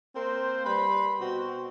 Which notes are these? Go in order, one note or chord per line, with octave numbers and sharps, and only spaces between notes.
A#3 C4 A#4 C5
G3 B4 B5 C6
B2 C4 F#4